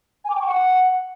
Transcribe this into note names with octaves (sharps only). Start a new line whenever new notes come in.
G#5
D6
G5
C#6
F#5